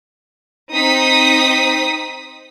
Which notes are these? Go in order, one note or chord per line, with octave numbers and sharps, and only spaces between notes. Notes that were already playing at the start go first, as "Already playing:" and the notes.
C4 D#4 D#6 B6